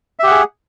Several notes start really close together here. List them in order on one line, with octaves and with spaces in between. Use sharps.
E5 G4 F#5 G#4